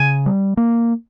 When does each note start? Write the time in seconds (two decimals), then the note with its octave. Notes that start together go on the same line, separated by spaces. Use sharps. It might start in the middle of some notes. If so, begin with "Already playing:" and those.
Already playing: C#3 G#5
0.26 G3
0.57 A#3